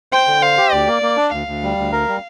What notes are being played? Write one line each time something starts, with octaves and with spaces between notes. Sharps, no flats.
C5 G5
D3
C5 F5
G4
D2 D5
A#3
A#3
D4
D2 F5
D2
G3
D2
A#4
G3